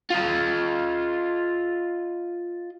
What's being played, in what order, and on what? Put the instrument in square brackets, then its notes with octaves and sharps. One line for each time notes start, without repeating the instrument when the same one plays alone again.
[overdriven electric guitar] F4 D#5